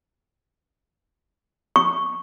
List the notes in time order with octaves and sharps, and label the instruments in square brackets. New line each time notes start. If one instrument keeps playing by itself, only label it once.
[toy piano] C#6